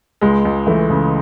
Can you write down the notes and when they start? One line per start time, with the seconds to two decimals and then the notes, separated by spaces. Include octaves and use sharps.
0.21 C#2 G#3
0.45 C#2
0.67 E3 A3
0.90 C#3